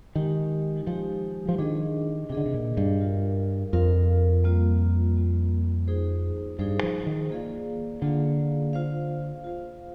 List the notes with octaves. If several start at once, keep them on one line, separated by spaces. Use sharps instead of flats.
D#3 G#3 D#4 G4
F3 G#3 D#4 G4
F3
D#3 D4 G#4 D#5
C3 D3 D4 G#4 D#5
C3
A#2
G2
F4 A#4 F5
F2 F4 A#4 F5
G3 A#3 F4
G3 A#3 F4
D#4 G#4 C5
G2 D#4 G#4 C5
F3
D#3
A#3 F4 G#4 D5 F5
D3 A#3 F4 G#4 D5 F5
F4 C5 F5
F4 C5 F5